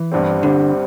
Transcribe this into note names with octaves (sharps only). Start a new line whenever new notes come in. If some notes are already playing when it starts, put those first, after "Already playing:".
Already playing: E3
G1 G2 G3 C4
G1 G2 D3 G3 C4